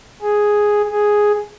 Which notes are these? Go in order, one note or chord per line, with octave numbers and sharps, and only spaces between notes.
G#4
G#4